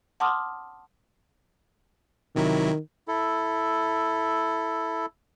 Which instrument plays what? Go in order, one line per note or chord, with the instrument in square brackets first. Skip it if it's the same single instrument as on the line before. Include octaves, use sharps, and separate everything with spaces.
[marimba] F#5 A5 C6 D6 D#6 F6
[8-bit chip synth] C3 F#3 E4 [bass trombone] D#3
[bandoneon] E4 A4